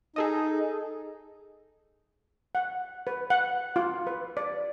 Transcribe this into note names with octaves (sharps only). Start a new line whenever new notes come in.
D#4 G#4 A4 D#5
F#5
B4
F#5
F4
B4
D5